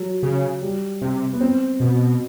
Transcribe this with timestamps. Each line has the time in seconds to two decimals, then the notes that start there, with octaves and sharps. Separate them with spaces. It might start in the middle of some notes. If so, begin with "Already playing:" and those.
Already playing: F#3
0.23 C#3
0.62 G3
1.02 C3
1.33 B3
1.40 C4
1.80 B2